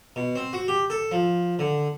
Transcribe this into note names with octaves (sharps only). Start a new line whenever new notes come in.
B2
C4
F#4
G4
A4
F3
D3